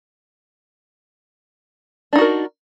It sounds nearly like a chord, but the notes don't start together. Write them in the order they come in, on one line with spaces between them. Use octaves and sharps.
D4 D#4 F#4 A#4